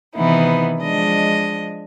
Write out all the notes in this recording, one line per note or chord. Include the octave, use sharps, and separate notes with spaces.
C3 D#3 E3 B3 D#4 E4
F3 G#3 D4 D#5